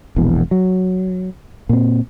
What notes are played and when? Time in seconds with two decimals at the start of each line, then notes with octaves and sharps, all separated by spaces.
0.16 E1 A#1 E2
0.51 F#3
1.69 A#2 C4